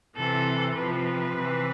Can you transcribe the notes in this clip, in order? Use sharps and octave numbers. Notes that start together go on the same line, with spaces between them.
C3 E3 A4
C3 F3 B4
C3 E3